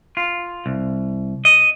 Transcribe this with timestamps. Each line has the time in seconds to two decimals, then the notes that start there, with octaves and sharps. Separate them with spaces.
0.17 F4
0.66 C2
1.45 D#5